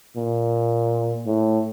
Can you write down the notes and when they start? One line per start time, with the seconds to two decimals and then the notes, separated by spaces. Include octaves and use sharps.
0.17 A#2
1.26 A2